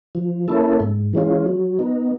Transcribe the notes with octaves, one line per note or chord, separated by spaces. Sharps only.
F3
A#3 C#4 E4 A4
G#2
E3 G#3 C#4 F4
F#3
B3 D#4